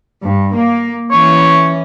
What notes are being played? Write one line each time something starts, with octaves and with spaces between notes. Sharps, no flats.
G2
A#3
E3 C#4 C#5